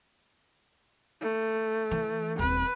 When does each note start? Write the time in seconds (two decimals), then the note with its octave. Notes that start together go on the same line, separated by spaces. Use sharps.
1.21 A3
1.91 E3
2.39 D#1 C4 B4